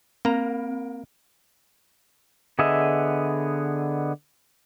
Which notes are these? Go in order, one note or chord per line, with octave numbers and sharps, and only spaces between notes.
A#3 C4 A#5
D3 B3 G#4 D#5 E5